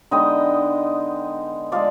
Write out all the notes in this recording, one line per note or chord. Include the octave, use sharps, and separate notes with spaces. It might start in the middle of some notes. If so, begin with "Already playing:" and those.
D3 G#3 B3 D#4 D#5 G5
F3 G#3 D5 F5